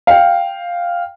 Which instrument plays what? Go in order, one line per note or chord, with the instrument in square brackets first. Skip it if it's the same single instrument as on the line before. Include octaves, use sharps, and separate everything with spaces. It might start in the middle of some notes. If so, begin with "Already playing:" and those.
[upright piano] F5 G5